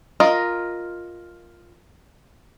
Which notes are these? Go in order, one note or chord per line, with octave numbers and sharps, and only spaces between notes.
F4 A#4 D#5